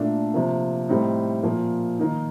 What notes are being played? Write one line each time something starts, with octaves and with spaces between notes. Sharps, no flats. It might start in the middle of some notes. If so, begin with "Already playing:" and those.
Already playing: A#2 A3 D4
C3 F3 A#3
A2 G3 C4 D#4
A#2 F3 A#3
D#3 A#3 D#4